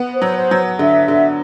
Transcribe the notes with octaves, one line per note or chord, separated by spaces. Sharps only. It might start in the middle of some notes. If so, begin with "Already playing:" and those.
Already playing: B3
C5
F#3
C5
F#3
D3 E5
D3